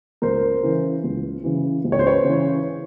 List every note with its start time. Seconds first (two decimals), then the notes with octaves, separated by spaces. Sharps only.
0.22 C#2 A#4 C5
0.63 C#3 E3
1.04 C#2
1.44 C#3 E3
1.84 C#2
1.92 C#5
1.99 C5
2.07 B4 C#5
2.25 C#3 E3